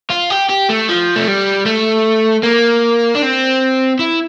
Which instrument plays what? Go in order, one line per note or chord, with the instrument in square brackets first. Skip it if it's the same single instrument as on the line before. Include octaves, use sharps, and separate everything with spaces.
[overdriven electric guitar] F4
G4
G4
A3
F3
A3
G3
A3
A#3
D4
C4
E4